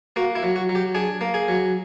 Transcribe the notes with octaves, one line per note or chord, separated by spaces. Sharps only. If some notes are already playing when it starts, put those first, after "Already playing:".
A#3 F#4
E4
F#3
F#4
F#3
G4
D4 G#4
A#3
G#4
F#3